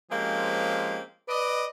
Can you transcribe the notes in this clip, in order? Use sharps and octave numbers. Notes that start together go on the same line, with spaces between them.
F3 G#3 A#3 C4 C#4 G4
B4 D5 D#5